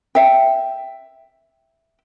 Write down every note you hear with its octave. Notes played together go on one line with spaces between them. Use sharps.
E5 G5